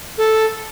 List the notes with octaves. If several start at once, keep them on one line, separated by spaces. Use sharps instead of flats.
A4